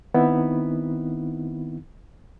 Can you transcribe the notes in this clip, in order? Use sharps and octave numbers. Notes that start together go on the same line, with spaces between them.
D#3 B3 C4 D#4 E4